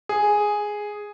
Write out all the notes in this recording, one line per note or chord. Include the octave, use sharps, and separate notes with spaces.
G#4